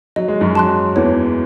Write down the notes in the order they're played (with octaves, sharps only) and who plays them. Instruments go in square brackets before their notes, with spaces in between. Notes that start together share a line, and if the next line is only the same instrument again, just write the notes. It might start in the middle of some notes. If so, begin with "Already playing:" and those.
[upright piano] F#3 [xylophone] D#5
[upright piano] G#3
F#2 F#3
[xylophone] A5 C6 F#6
[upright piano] E2 E3 [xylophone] C#5